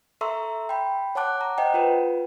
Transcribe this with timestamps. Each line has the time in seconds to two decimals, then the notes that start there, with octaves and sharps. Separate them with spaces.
0.21 A4 E5 A#5 C6 C#6 E6
0.69 G5 B5
1.15 C#5 F#5 A5 D6 F#6
1.41 A#5
1.58 C5 D#5 F#5 G5
1.74 F4 B4